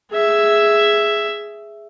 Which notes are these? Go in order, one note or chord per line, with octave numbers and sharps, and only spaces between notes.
G#4 E5